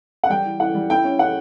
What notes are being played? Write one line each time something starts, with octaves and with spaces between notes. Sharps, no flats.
F#5
G3 G5
E3
E3 F#5
G3
E4 G5
C#4
E4 F#5